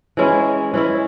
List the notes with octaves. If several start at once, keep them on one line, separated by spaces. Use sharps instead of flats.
E3 G#3 C#4 E4
E3 G#3 C#4 E4